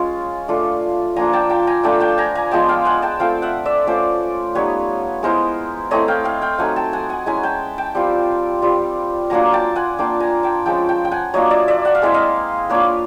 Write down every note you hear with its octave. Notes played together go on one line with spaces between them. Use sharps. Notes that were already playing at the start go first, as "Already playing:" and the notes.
Already playing: G#3 C#4 F4
A3 D4 F4
F3 A#3 D4 F4 G#5 A#5
G5 A5
G5 A5
G#5 A#5
A3 D4 F4 G5 A5
G5 A5
G#5 A#5
G#5 A#5
F3 G#3 B3 G5 A5
F5 G5
F#5 G#5
G5 A5
A3 C4 F4 F5 G5
E5 F#5
D5 E5
A3 C#4 F4 C5 D5
G3 B3 D#4 B4 C#5
G#3 B3 E4 A#4 C5
A3 C4 E4 C#5 D#5
F5 G5
F5 G5
F5 G5
F#3 A3 C4 D#4 F#5 G#5
G5 A5
F#5 G#5
F#5 G#5
G#3 C#4 E4 G#5 A#5
G5 A5
G5 A5
G3 C4 F4
G3 C4 F4
F#3 A#3 D4 F4 G#5 A#5
G5 A5
F#5 G#5
A#3 D4 F4 G5 A5
G#5 A#5
G5 A5
F3 G#3 C#4 G5 A5
G5 A5
G5
F#5 G#5
F#3 A#3 D4 F4 C#5 D#5
D5 E5
D5 E5
F#5
F5
G#3 C4 E4 E5
D#5 F5
A#3 D4 F4 B4 C#5